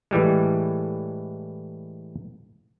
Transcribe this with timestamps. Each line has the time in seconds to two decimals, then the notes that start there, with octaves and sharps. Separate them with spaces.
0.11 A2 E3 G3 G#3